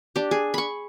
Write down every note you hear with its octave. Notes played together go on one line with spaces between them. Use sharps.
D4 G4
G#4
B5 C#6